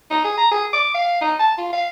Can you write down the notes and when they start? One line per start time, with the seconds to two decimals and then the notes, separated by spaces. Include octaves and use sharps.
0.10 D#4
0.24 G#4
0.37 A#5
0.51 G#4
0.73 D6
0.94 F5
1.21 D#4
1.39 A5
1.58 F4
1.73 F5